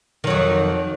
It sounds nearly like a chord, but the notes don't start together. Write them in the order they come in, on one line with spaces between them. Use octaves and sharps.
D#3 F#3 F2